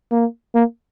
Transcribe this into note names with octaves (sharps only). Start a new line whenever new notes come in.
A#3
A#3